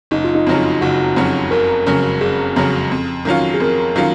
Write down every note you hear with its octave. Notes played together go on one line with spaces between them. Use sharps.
F#1 D#4
F4
D#4
F2 C#3 F#3 C#4
F4
F#1 F#4
F2 C#3 F#3 C#4
F#1 A#4
F2 C#3 F#3 C#4
F#1 G#4
F2 C#3 F#3 C#4
F2
D#3 F#3 C#4 F4
G#4
F2 A#4
D#3 F#3 C#4 F4